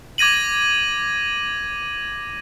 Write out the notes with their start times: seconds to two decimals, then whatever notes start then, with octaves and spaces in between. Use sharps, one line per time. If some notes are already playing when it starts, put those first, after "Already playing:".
0.18 D6 G#6 A#6 D#7 F#7